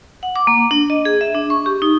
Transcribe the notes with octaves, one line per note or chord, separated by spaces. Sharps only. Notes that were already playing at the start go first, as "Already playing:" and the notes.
F#5
D6
A#3
D4
D#5
G#4
E5
D4
C#6
G4
D#4